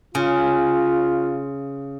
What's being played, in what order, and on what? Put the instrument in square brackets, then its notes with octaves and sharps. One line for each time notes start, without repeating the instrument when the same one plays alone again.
[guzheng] C#3 [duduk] F4